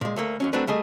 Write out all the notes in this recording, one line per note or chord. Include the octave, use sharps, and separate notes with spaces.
A#2 G#3
D2 A3 A#3
D#2 F#3 C#4
F#3 A3 C4 D4 B4
G3 A3 G#4 D#5